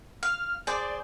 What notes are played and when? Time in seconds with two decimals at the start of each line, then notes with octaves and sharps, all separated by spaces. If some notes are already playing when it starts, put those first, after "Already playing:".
0.23 F5 F6
0.67 G#4 C5 D5